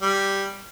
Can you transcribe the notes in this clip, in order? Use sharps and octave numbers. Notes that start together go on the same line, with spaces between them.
G3